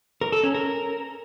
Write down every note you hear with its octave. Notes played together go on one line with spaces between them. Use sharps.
A#4
A4
C#4
A#4